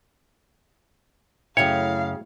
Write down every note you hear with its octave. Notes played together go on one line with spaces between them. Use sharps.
F#2 C#3 A3 E4 C#5 F5 G5